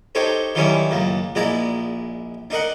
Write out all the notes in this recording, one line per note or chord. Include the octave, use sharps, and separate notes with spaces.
D#4 G4 A4 C5 C#5
D#3 E3 F#3 G3 C#4 E4
C#2 F#2 A#3
A#1 G#3 E4 D5 A#5
D4 D#4 A#4 F#5